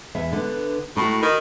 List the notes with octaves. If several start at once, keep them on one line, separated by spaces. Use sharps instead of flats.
E2 E5
D3 B3
A2 F#4 A#5
D#3